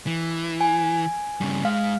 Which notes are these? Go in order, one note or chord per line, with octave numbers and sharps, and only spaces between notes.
E3
G#5
G2 C#3
G#2 G#3 F5